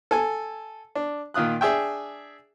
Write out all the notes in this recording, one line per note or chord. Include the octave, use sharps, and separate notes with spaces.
A4 G#5
D4
A#2 D#3 F4 D#6 F#6
D4 G#4 E5 G5